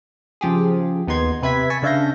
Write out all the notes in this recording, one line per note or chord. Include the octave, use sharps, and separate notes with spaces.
C#3 F3 G4 G#4
D#2 B3 D#4 C6 G#6
C3 B4 E5 G#6 B6
G#5 A5 C#6 B6
C#3 D4 E5 F5 G6 A#6